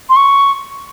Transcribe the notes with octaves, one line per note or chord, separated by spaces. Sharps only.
C6
C#6